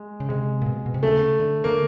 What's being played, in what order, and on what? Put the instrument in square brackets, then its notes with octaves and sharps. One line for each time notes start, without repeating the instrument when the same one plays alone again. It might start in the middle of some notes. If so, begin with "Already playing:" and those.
Already playing: [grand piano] G#3
[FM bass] C#3
[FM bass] C3 [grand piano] G#3
[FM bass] A#2
B2
B2
C3
[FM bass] C#3 [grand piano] A3
[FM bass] D3
[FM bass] D3 [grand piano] A#3